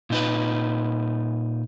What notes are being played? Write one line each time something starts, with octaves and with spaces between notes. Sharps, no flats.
A#2 D#4 B4